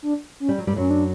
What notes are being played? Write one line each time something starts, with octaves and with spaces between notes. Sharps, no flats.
D4
C#4
G3
F#3
G2 G3
F#2 F#3 C#4
D4